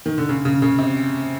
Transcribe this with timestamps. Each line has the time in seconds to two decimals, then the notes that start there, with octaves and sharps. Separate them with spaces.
0.06 D#3
0.18 D3
0.29 C#3
0.45 C#3
0.62 C#3
0.79 C3